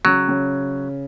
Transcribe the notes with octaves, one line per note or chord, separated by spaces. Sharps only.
C#3 F#3
C#3